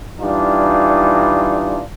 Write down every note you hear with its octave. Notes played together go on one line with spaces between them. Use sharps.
E3 G3 D4 D#4 F4